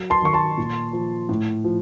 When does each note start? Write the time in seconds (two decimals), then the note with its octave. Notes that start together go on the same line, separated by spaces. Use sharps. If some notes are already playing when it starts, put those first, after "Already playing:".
Already playing: F#3
0.10 A5 C6
0.22 D#3 C#6
0.33 A5 C6
0.58 A#2
0.93 F3
1.29 A2
1.64 F3